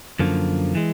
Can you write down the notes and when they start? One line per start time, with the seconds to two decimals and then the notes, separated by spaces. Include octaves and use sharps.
0.19 F#2 D3 F3 A#3
0.75 E3 G#3